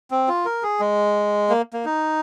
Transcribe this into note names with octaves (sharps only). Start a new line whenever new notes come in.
C4
F4
A#4
G#4
G#3
A#3
A#3
D#4